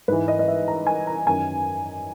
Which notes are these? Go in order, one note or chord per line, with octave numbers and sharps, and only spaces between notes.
G#2 E3 B4
D#5
D#5
E5
A#5
G#5
A#5
F#2 D#3 G#5